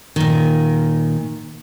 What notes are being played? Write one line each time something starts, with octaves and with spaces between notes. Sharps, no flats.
A#2 D#3